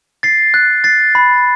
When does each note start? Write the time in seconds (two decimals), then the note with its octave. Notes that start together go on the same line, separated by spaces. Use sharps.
0.23 A6 C7
0.54 F#6
0.84 A6 C7
1.15 B5